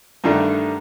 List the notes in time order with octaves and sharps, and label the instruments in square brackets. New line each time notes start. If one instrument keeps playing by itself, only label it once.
[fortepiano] G2 D3 D#3 G3 A3